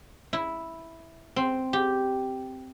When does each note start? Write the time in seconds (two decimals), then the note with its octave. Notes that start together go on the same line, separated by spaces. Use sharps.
0.33 E4
1.36 C4
1.73 G4